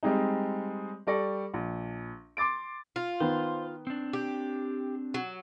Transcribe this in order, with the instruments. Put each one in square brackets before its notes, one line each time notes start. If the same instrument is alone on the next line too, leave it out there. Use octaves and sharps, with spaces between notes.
[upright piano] G3 G#3 C4 D#4
G3 A4 D5 C#6 A#6
A#1
C6 D6 A6 D7
[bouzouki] F4
[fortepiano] D#3 B3 [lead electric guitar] C5
[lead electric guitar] C4 D4
[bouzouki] G4
F#3